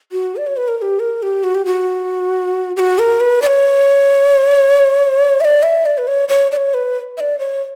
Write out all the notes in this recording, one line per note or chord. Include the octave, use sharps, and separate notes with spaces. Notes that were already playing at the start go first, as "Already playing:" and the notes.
F#4
D5
C#5
B4
A#4
A#4
G4
A#4
G4
F#4
G4
F#4
G4
F#4
A#4
B4
D5
C#5
E5
D5
E5
D5
B4
C#5
C#5
D5
C#5
B4
E5
D5
C#5